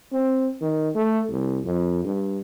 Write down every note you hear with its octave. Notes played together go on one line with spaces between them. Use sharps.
C4
D#3
A3
C2
F2
G2